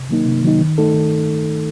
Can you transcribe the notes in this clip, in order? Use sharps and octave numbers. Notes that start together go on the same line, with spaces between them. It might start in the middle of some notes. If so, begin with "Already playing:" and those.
Already playing: C3
D#3 F#3 A#3 D#4
C3
D#3 F#3 A#3 D#4
D#3
A3 D#4 A4
D#3